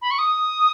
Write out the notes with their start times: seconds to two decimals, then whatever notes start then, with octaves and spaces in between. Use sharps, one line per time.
0.02 B5
0.11 C#6
0.19 D#6